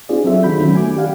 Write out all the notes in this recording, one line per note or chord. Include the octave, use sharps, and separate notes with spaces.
C4 D4 F4 G#4 D5
F#3 C4 A4 C5 E5
D#3 F#4 B5 G6
D#3 F#3 A3 B3 C#4
G#5 D6
G4 D5 F5 F#5